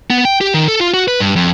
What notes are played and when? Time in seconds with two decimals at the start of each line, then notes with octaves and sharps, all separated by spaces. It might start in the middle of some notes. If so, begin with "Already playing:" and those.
0.10 B3
0.25 G5
0.41 G4
0.54 D#3
0.68 A4
0.81 F4
0.94 F#4
1.08 B4
1.20 G2
1.36 F2